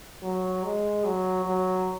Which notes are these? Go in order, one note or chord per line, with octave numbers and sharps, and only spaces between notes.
F#3
G#3
F#3
F#3